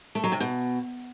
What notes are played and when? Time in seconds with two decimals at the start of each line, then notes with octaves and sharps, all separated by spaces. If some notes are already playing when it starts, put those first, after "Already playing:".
0.15 A3
0.24 F#3
0.32 C3
0.40 B2